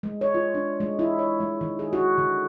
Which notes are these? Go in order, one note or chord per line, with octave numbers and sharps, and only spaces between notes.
G#3
C#5
F4
D4
G#3
E4
C#5
G#3
D#3
G#4
F#4
D3